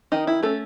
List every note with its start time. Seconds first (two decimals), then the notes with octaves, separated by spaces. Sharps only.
0.12 D#3 D#4
0.27 E4
0.43 A3 C#4 A4